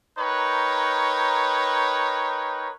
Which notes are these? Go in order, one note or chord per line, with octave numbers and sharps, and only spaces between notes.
D#4 A#4 B4 C#5 G5